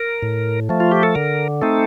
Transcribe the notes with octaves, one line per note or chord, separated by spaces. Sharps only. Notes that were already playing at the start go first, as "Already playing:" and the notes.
Already playing: A#4
A2
F3 A3
F4
G4
A4
D3 A#4
A3 C4 D#4 A4